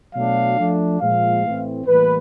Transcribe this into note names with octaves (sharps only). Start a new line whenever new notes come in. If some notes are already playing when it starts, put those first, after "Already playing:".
B2 F#3 A3 D4 F5
F3 A3 D4
A#2 F3 G#3 F5
A2 E3 A3 C4
A2 E3 G3 A#3 B4